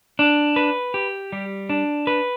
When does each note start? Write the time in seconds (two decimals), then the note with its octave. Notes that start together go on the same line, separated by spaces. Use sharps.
0.19 D4
0.56 B4
0.94 G4
1.32 G3
1.70 D4
2.07 B4